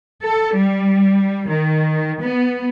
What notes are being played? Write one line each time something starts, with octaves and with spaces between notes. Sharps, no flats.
A4
G3
D#3
B3